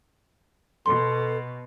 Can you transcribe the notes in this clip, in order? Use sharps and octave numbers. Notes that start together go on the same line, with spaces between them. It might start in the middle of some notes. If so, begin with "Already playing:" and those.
B2 A4 C6